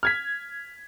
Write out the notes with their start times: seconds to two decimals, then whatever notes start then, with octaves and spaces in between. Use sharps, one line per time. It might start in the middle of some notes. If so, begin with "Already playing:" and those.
0.03 F6 G#6 B6